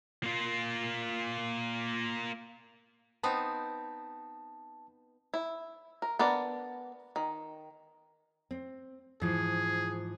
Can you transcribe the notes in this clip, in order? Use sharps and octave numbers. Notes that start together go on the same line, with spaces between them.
A#3 F4
B3 C4 D#4 A5
E4
A#4
B3 D4 A#4 D5
D#3
C4
G#2 E3 F3 G#4